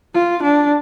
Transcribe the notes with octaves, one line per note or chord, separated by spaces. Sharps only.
F4
D4